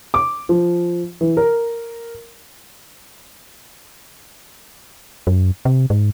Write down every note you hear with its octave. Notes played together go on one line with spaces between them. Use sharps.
D6
F3
E3
A#4
F#2
C3
G#2